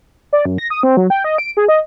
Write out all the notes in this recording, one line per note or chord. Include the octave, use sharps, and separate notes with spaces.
D5
F#2
A#6
D#6
C4
F#3
G5
D#5
D7
G#4
D#5